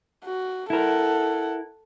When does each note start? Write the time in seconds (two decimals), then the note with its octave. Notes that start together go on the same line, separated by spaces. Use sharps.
0.24 F#4
0.70 E4 A4 A#4 F#5